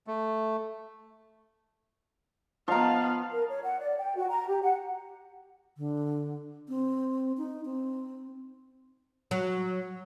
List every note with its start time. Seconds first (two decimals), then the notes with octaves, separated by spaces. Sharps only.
0.07 A3
2.68 F3 B3 D#4 F5 A#5
3.32 A#4
3.49 C#5
3.63 F#5
3.79 D5
3.98 G5
4.17 F#4
4.30 A#5
4.48 G4
4.63 F#5
5.78 D3
6.69 C4
7.38 D#4
7.65 C4
9.31 F#3